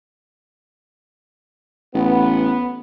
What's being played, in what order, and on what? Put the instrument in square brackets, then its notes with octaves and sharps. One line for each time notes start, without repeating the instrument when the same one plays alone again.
[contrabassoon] A1 [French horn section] B3